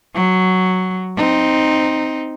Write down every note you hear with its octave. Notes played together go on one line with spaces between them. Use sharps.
F#3
C4 D#4